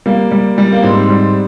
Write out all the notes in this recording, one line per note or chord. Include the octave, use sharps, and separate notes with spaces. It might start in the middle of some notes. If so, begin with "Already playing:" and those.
G3 A#3
G3
G3
A#3
G#2 C4
G3